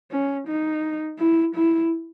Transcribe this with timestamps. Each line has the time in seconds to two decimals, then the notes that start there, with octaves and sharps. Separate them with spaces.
0.11 C#4
0.48 D#4
1.19 E4
1.55 E4